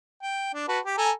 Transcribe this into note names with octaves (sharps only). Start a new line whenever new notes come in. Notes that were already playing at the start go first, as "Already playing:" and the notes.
G5
D4
F#4 B4 A5
G4
A4 G#5 A#5